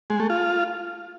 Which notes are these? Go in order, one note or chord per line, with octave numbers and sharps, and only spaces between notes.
G#3
A3
F4